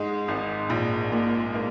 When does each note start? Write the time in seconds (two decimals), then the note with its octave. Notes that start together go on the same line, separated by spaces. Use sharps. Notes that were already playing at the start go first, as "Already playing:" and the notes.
Already playing: G#2 G#3
0.28 G#1
0.70 A#1
1.12 A#2
1.54 A#3